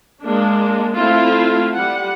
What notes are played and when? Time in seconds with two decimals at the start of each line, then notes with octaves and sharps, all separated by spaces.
0.22 G#3 A#3 D4
0.97 A3 C4 E4 F4 F5
1.75 G3 F#5